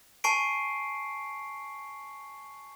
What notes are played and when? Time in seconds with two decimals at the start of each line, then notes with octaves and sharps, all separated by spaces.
0.24 G#5 A5 C#6 C7 D7